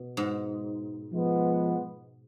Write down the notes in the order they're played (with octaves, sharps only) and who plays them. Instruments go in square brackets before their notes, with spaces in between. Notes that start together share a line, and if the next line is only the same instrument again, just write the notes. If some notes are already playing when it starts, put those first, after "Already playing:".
Already playing: [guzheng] B2
G#2
[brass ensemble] F3 G#3 B3